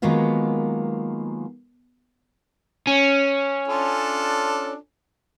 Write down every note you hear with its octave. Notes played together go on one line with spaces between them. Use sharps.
D#3 F#3 G#3 A#3 B3 F4
C#4
D4 F4 A4